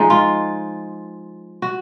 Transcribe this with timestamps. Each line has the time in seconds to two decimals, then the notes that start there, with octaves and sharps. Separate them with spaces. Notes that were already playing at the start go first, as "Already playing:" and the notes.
Already playing: F3 G#3 D#4
0.10 F4
1.62 F#4